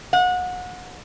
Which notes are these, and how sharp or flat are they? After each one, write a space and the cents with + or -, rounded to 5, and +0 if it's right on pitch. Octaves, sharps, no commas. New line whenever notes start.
F#5 -30